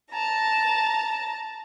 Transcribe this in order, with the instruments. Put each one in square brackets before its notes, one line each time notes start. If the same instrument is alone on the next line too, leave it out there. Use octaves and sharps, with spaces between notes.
[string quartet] A5 A#5